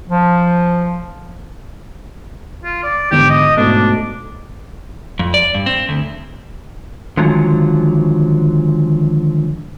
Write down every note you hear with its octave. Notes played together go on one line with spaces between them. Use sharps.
F3
F4
D5
E2 G#2 D3 G4
D#5
G#2 B2 A3 D4
F2
D5
G2
C4
D2
D3 D#3 F3 F#3 G#3